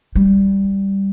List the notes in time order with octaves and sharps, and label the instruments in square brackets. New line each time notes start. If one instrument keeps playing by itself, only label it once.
[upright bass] G3